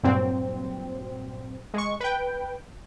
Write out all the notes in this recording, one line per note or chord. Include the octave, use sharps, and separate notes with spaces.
G2 A#2 F#3 C4
G#3 C#6
B4 G5